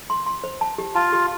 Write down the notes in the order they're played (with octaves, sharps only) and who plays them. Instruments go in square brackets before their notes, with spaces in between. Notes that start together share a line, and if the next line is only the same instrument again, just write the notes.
[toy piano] C6
C6
C5
A5
G4
[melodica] F4 [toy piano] A5
[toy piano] G4